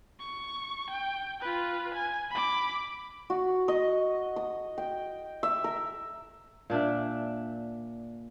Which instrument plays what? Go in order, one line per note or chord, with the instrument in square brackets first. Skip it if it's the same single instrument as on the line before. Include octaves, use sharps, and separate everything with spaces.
[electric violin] C#6
G5
F4 B4
G#5
B5 D6
[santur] F#4
D#5
D#6
G5
E5
A#4
[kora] A#2 D4 D5 E5